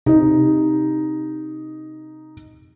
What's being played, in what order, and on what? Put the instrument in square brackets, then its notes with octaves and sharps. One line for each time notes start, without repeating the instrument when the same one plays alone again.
[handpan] C3 [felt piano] D#4